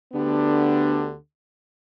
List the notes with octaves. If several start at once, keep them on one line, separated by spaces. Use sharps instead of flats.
D2 D3 B3 D4 G4